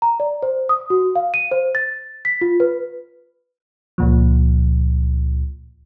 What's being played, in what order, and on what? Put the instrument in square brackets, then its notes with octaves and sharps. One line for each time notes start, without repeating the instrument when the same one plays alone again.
[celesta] A#5
D5
C5
D#6
F#4
F5
D#7
C5
A6
B6
F4
B4
[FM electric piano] C#2 A#2 F3